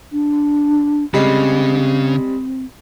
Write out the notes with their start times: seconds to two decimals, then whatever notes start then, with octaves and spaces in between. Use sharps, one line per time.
0.12 D4
1.14 C#3 G3 G#3 C4